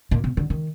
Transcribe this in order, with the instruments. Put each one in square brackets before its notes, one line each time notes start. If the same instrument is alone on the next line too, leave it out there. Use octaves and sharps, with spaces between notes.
[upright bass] A#2
B2
D3
D#3